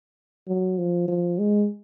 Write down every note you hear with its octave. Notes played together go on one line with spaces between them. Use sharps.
F#3
F3
F3
G#3